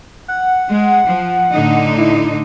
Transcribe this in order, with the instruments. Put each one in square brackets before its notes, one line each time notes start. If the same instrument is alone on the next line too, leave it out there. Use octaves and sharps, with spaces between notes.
[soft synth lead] F#5
[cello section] G#3
F3
A2 D3 D#4
[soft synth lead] E4